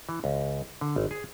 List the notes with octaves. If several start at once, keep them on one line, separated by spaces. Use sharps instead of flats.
E3
C#2
D3
G#1
G#4